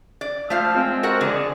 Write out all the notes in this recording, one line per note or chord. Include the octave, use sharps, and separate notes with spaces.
D5
F3 A3 F5
G#3 C4
F#4 A#4 F#5
F2 D3 G#4 D5